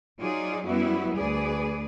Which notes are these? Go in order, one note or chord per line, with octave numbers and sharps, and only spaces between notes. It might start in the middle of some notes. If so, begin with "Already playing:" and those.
F#3 D#4 F4 G#4 D5
F#2 G3 B3 E4 F#4
D2 G#4 B4 D5